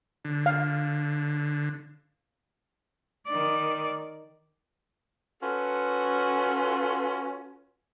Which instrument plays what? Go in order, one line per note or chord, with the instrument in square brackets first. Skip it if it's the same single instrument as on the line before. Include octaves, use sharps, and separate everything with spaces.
[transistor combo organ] D3
[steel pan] F5
[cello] D#3 D5
[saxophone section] C#4 F4 F#4 A4 B4